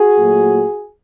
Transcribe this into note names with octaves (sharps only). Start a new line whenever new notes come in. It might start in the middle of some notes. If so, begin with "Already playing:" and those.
Already playing: F#4 G#4
A#2 F#3 A3